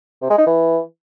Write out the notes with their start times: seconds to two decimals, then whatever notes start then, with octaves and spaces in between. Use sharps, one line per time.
0.22 C3
0.30 G#3
0.38 D#4
0.46 E3